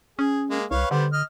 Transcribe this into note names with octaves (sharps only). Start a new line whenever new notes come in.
C#4 G#4
G#3 A#3
C2 B4 C#5 F5
D3 G3 B3 C5
D#5 F6